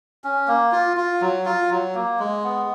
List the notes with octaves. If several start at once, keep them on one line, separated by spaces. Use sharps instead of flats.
C#4
A#3
F4
F4
F#3
F4
F#3
A#3
G#3
B3